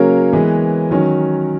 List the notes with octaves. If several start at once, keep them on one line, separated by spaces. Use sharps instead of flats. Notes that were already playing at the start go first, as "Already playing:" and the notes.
Already playing: C#3 F#3 A#3 C#4 A#4 C#5
E3 G#3 B3
D#3 F#3 C#4